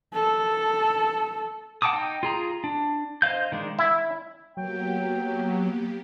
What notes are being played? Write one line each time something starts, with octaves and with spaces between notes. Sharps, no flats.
A4
F#5 G5 A5 D6 D#6
D#4 G5
F4 G#4 A#5
D4
C5 D#5 F5 G6
D#3 G#3 D4
E4
F#3 A#3 B3 G4 G5